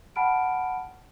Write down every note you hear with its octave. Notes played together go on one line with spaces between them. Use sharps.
F#5 G5 A5 B5 F6 D7